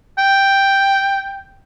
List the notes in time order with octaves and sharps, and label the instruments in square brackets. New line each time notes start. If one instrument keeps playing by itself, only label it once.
[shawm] G5